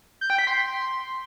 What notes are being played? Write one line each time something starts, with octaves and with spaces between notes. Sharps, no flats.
G6
G5
B6
C6